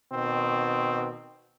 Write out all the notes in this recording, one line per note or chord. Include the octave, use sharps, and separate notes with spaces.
B2 D#3 C4